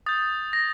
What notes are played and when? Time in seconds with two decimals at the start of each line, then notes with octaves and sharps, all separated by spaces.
0.06 D#6 G6 A6
0.53 A#6